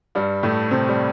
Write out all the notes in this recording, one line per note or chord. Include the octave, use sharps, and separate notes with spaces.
G2 G3
A2 A3
C3 C4
G3